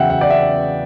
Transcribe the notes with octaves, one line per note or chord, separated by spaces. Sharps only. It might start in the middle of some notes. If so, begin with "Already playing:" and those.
Already playing: E2 C#3 F#3 E5 F#5 G5
F#5
D5
E5